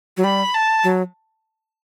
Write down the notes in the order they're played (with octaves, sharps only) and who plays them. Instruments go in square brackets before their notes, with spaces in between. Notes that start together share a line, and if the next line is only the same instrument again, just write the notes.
[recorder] F#3
[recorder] G3 [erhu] B5
[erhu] A5
[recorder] F#3